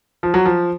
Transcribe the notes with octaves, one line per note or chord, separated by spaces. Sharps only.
F3
F#3
F3